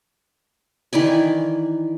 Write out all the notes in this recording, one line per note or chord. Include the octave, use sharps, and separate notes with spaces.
D#3 E3 D5 G#5